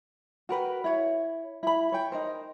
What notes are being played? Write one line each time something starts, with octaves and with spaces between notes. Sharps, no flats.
F#4 A#4 B4 G5
E4 C#5
E4 B5
C#5 G5
D#4 A#4 C5